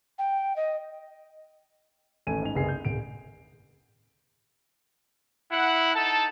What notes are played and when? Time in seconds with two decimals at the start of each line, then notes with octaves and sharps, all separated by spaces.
0.19 G5
0.56 D#5
2.27 A1 D#2 A3 G#5 D#7
2.42 G#2 G#5 F7
2.55 F#1 C2 B3 G#4 G#5 C7
2.69 G6
2.85 D1 D7
5.51 E4 F#5
5.94 D#4 A4 A5